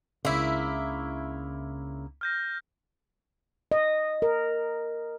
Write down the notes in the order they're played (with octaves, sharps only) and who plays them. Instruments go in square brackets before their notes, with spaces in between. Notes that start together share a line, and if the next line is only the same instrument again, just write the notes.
[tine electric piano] C#2 D4 C6 [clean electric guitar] C#3 [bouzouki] A#3 E4
[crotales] F6 G6 A#6
[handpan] D#5
A#4